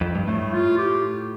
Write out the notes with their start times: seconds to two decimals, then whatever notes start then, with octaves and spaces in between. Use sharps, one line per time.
0.01 F2
0.15 G2
0.27 A2 A3
0.53 F4
0.78 G4